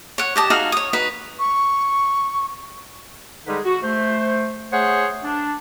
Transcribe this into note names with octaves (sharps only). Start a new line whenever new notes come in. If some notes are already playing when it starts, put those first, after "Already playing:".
C#5 F#5
G4 D#5 A5
D#4 F#4 G#4 F5
C#5 D#6
D#4 F#4 B4
C#6
D3 G3 G#3 D#4 G#4 B4
F#4
A3 C5
A3 G#4 C5 C#5 F#5
D4